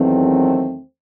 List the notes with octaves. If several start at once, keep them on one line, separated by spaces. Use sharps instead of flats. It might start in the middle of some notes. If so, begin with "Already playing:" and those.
Already playing: E2 D#3 F#3 A3 C4